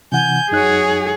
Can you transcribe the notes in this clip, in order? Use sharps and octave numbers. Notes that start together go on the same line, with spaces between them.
C3 E3 F#5 G#5 G6
F#2 F#3 D#4 F#4 G#4 C#5 F#6